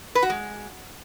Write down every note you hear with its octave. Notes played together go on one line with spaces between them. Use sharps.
B4
F#4
G#3